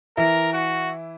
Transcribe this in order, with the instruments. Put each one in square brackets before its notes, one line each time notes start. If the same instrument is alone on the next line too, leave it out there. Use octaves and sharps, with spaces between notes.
[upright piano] E3 E4 [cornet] A#4
[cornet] F#4